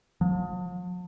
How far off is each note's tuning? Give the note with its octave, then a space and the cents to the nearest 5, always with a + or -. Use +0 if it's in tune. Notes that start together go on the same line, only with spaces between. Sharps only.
F3 +45